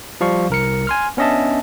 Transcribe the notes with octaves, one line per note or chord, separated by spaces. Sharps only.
F3 G3 F5 C#6
C2 A#4 C#7
G#5 C6 F6
B3 C#4 D4 D#5 E5 A5